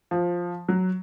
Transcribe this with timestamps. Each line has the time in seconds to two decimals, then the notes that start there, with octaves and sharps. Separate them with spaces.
0.11 F3
0.68 F#3